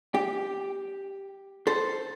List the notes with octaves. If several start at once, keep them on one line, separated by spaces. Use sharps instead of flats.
G4
A4 C5